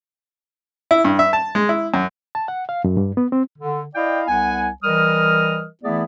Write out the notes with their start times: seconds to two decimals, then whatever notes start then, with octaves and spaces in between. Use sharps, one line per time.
0.91 E4
1.05 G2
1.19 E5
1.33 A5
1.55 G#3
1.69 E4
1.94 F#2
2.35 A5
2.48 F#5
2.69 F5
2.84 F#2
2.97 G2
3.17 B3
3.32 C4
3.59 D3
3.95 E4 D5 D#5 F5 G5
4.28 C2 B3 F#5 G#5
4.83 E3 G3 A#4 D#5 D#6 F6
5.84 E3 A3 B3 E4 G#4 D5